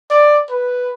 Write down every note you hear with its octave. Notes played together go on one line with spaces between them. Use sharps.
D5
B4